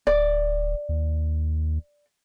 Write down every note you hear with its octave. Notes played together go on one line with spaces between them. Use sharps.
D1 D5
D#2